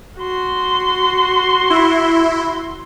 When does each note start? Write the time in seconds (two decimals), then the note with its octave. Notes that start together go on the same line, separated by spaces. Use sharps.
0.19 F#4 C6
1.70 E4